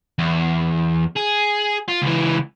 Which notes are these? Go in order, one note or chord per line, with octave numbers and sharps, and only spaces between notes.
E2
G#4
F4
C#2 E3